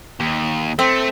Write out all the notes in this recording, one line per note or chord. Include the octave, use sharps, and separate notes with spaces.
D#2
A3 C4